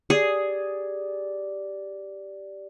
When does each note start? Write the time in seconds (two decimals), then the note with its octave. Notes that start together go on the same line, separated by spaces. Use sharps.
0.10 G4 G#4 D5